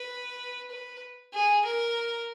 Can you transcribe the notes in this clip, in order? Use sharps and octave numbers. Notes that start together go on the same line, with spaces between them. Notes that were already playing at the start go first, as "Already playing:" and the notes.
Already playing: B4
B4
G#4
A#4